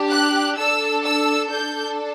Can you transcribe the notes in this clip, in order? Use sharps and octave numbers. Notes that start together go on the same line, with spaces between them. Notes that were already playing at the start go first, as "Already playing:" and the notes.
Already playing: D4 G4
F#6
D4 A4 E6
E6
D4 A4 G6